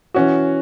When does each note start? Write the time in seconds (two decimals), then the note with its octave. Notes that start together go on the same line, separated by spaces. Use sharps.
0.14 E3 C#4 F#4